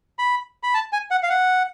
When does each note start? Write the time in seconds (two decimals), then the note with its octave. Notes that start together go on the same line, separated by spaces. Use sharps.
0.19 B5
0.63 B5
0.74 A5
0.93 G#5
1.11 F#5
1.23 F5
1.29 F#5